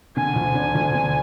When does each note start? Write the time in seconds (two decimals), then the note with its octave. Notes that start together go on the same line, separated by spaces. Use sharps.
0.16 D3 G#5
0.36 D2
0.55 D4
0.75 D2
0.94 D3